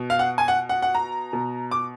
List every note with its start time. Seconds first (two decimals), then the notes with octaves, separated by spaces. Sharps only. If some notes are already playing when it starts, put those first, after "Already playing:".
Already playing: B2
0.10 F5
0.19 F#5
0.38 G#5
0.48 F#5
0.69 F#5
0.82 F#5
0.95 A#5
1.33 B2
1.71 D6